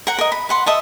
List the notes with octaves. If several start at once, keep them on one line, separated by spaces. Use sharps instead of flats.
A#4 F#5
A#4 D#5
B5
B4 F#5 C6
D#5 E5 A5